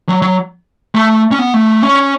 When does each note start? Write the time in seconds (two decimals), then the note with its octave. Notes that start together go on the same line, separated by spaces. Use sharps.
0.09 F#3
0.22 F#3
0.95 A3
1.31 C#4
1.39 B3
1.54 A3
1.82 C#4